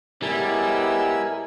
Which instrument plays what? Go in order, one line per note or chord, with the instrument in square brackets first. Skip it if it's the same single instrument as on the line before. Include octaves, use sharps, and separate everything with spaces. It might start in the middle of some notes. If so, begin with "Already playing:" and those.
[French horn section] A2 G#3 B3 [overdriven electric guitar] G3 [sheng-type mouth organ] E4 E6 [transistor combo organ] A#4 G#5